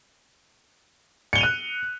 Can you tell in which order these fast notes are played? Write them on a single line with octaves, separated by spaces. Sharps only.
C#7 G7 F7 D#7 F#6